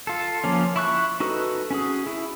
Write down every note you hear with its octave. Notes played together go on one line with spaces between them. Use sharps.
F4 A4
F3 A#3 C#4
E4 C#6 F#6
D#4 F#4 A4 B4
C#4 F#4 G#4
E4